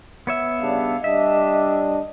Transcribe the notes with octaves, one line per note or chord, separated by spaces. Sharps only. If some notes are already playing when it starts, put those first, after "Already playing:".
B3 C#5 E5
C#3 G3 D4 F5
G3 D4 D#5 E5